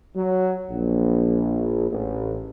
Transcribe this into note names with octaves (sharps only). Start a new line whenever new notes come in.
F#3
A#1
A1